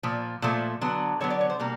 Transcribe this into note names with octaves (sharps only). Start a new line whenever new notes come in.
A#2 F3
A#2 F3 A3
D3 F#3 B3
D3 F#3 B3 C#5
D5
C#5
C5
B2 G3 A#3